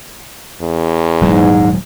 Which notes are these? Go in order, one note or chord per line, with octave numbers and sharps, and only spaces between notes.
E2
D#1 G#2 F#3 G#3